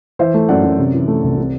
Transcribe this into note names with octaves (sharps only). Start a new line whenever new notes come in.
E3 C5 E5
A3
F#2 D5 F#5
F#2
C3
E3
A3
C2
C3